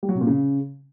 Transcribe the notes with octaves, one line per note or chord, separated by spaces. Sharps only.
G3
F#3
C3
A#2
C#3